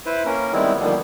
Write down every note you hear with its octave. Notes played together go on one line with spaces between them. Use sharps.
E4 B4 C5
A#3 C#4 A#4
D#3 G3 G#3 B3 C4 E4
D3 D#3 F3 G3 A#3 B3